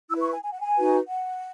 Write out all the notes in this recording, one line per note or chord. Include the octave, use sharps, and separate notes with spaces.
E4 B4 E6
C#6
G#5
G#5
F#5
G#5
D#4 F#4 B4
F#5